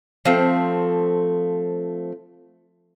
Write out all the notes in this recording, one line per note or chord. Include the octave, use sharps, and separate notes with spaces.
F3 A3 C4